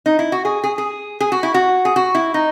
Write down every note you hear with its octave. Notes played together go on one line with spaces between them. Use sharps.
D#4
E4
F#4
G#4
G#4
G#4
G#4
F#4
E4
F#4
G#4
F#4
E4
D#4